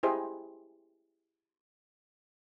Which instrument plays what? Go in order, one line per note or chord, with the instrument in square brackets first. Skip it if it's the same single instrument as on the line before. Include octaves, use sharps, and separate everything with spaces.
[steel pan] E4 G4 G#4 C5 D#5